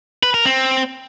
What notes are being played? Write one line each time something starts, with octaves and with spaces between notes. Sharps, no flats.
B4
A#4
C4